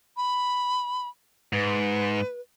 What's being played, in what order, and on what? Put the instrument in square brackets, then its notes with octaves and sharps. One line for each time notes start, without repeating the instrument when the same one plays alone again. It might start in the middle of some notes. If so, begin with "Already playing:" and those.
[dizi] B5
[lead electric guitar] G#2 [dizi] B4